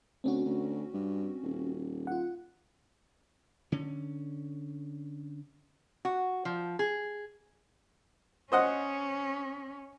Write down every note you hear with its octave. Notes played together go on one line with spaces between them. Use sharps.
D2 C4 C#4 F#4
D2
G2
D#1
F4 F#5
D3 C#4
F#4
F3
G#4
C#4 C5 D#5 F#5